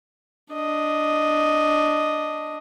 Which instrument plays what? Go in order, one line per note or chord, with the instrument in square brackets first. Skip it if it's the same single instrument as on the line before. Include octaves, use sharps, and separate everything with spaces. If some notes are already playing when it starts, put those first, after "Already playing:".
[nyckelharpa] D4 D#5